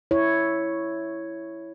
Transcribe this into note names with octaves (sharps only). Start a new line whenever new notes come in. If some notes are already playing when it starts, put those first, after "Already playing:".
E4 C#5